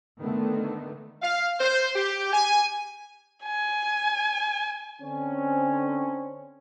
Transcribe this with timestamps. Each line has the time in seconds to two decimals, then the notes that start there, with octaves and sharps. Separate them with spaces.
0.21 D3 D#3 A3 B3
1.21 F5
1.60 C5
1.95 G4
2.33 G#5
3.44 G#5
5.01 D3 C4 C#4